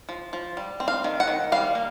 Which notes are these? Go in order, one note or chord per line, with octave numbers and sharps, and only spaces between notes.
F3
F3
G3
C4
F5
D#3
F#5
D#3
G3 F5
A#3